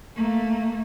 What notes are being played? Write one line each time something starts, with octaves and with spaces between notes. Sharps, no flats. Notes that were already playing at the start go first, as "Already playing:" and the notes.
A3 A#3